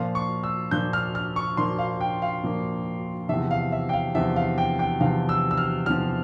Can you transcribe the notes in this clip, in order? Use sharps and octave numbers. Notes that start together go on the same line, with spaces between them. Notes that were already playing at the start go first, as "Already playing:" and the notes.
Already playing: A#2 F3 A#3 F5
C#6
E6
A#2 F3 A#3 G6
F6
F6
C#6
A#2 F3 A#3 C6
F5
G5
F5
A#2 F3 A#3
E2 C3 F3 E5
F5
E5
G5
F5
E2 C3 F3 E5
F5
G5
G5
E2 C3 F3 F5
E6
E6
F6
E2 C3 F3 F6